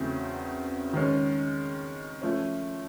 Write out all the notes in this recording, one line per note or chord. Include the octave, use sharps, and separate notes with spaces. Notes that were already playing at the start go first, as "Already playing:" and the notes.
Already playing: E2 C#3 F#3 A3 C4
D#3 G#3 C#4
F3 A3 C#4